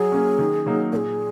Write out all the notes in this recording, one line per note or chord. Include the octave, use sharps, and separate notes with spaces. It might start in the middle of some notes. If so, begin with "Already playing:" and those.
Already playing: F#3 G#4
A#3 C#4
D#3
F#3 A#3 D#4
A#2 G#4 A#4